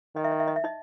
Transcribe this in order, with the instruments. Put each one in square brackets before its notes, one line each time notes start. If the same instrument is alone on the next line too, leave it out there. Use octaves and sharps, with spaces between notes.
[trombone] D#3 [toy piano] D#5
[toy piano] E5
D#5
E5
D#5
E5
D#4 D#5